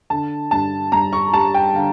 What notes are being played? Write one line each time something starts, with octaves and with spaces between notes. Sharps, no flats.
D3 A5
G2 A5
G2 A#5
C#6
G3 A5
G5
D3 F5